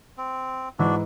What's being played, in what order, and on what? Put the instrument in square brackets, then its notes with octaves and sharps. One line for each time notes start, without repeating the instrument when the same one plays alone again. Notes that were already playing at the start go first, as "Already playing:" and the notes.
[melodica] C4
[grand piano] G#2 E3 [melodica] D4 F#4